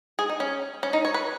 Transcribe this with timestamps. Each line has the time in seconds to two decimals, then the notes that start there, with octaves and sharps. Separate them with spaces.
0.19 G#4
0.30 D#4
0.40 C#4
0.83 C#4
0.93 D#4
1.05 C#5
1.14 B4